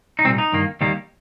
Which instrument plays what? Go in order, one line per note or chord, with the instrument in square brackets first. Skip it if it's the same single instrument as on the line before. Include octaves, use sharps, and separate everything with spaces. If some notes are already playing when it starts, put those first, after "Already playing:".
[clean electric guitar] D#4
C2 A#2 G3 C4
D#4
G2 D#3 A#3
D#2 D#3 G3 A#3